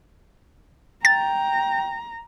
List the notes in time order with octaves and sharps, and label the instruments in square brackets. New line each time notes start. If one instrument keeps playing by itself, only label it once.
[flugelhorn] G5 [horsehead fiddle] A#5 [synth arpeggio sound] A6